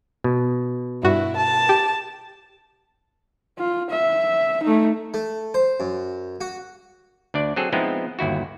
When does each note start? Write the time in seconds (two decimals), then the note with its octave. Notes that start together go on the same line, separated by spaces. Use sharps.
0.24 B2
1.03 G2 E4 F#4
1.37 A5
1.69 G4
3.58 F4
3.90 E5
4.63 A3 D#4
5.14 A3
5.54 C5
5.80 F#2
6.41 F#4
7.34 D2 D4 D5
7.56 F#3 C4 G#4 A4
7.73 F3 G#3 B3 C4 D#4 E4
8.19 G1 D#2 E4 F#4